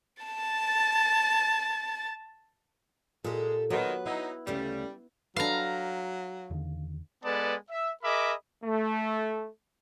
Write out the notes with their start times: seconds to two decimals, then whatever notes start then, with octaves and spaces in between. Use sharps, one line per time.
0.23 A5 A6
3.24 A#2 G#3 G4 A4
3.70 A#2 D#3 F#3 B3 B4
4.06 F#3 D#4 E4
4.47 D2 C#3 G3 A3
5.36 F#3 D4 A4 B4 F5 A#5
6.50 E2 D3 D#3
7.24 G#3 B3 A4 B4 D5 A5
7.70 E5
8.03 G#4 A#4 D#5 E5 B5 D6
8.64 A3